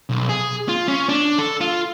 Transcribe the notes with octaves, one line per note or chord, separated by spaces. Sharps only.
B1
G#4
F4
C#4
D4
A4
F4